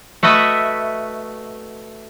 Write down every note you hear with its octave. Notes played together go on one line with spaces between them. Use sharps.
A3 F#4 B4 D#5 E5